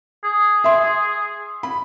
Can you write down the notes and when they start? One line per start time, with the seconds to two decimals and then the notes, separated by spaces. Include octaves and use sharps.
0.24 G#4
0.64 E5 C6
1.63 B5